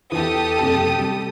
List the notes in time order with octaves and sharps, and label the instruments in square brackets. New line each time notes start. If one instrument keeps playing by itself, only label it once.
[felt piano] E2 E3 [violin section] G4 A4 D#6
[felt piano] F#1 C3 A5
C3 G3